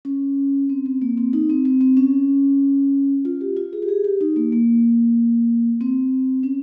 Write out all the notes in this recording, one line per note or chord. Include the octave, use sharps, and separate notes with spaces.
C#4
C4
C4
A#3
C4
D#4
C4
C4
C4
C#4
F4
G4
F4
G#4
G4
G#4
G4
D#4
A#3
A#3
C4
C#4